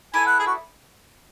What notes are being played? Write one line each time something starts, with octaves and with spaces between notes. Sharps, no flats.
B3 E4 A4 D5 G#5
F#5
G#4
F#4